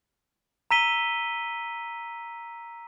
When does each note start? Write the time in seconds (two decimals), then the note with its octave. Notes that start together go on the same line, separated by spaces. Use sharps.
0.71 A#5 E6 B6 D#7 G7